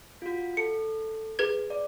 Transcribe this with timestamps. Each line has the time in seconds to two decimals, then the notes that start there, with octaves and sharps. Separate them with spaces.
0.22 F4 F#4
0.57 A4 C#7
1.39 G#4 B4 G#6
1.70 D5